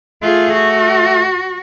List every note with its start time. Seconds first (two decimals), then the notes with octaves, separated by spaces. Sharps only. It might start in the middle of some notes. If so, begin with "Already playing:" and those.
0.23 A3 F4 G#4
0.54 F#4